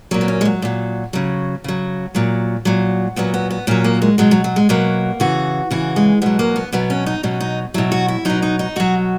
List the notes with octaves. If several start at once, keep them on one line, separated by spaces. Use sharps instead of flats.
A#2 F#3 A#3
B3
C#4
G#3
F#3
A#2 F#3
C#3 F#3
C#3 F#3
A#2 F#3
A#2 F#3
A#2 F#3 B3
B3
B3
A#2 F#3 C#4
A#3
G#3
B2 F#3 G#3
F#3
F#3
G#3
B2 F#3 A#3
C#3 E3 F#4
C#3 E3 F#4
G#3
B2 F#3 G#3
A#3
B3
B2 F#3 B3
C#4
D#4
B2 F#3 C#4
D#4
B2 F#3 E4
F#4
E4
B2 F#3 D#4
D#4
D#4
B2 F#3 F#4